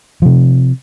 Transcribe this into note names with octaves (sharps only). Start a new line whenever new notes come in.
C3 F3